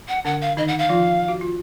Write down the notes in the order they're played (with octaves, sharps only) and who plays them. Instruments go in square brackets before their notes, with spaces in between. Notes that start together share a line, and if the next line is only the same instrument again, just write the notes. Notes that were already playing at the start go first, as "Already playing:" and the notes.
[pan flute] F#5
[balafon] D3 D4 [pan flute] F#5
[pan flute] F5
[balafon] D#3 D#4 [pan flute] D#5
[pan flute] F#5
F5
[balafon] F3 F4
F#4
F4